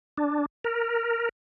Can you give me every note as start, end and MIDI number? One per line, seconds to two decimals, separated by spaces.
0.18 0.46 62
0.64 1.29 70